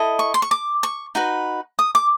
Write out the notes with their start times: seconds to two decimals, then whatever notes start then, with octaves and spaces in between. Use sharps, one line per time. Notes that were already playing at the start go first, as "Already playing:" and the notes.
Already playing: E4 A4 D#5
0.19 C#6
0.34 C6
0.42 C#6
0.51 D6
0.83 C#6
1.15 D#4 F#4 B4
1.79 D#6
1.95 D6